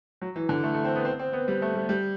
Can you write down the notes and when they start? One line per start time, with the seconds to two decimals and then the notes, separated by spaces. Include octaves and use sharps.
0.22 F#3
0.36 E3
0.49 D3
0.63 A3
0.74 A3
0.84 C4
0.96 B3
1.05 C4
1.19 C4
1.33 B3
1.48 G3
1.62 A3
1.75 G3
1.89 G3